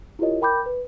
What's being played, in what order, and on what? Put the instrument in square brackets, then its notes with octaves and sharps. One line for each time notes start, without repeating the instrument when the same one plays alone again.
[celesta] E4 F4 G4 A#4 C#5 D#5
A#4 G5 B5 D6 G6
B4